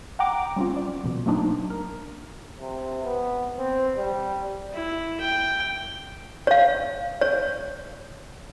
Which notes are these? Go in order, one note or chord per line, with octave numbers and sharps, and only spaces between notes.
F#5 G5 A#5 D6
G3 C4 C#4 F4
D5
F2 B2
F#3 A3 A#3 C4 D4 D#4
A#4
C3
B3
C4
G3
E4
G5
C#5 F5
C#5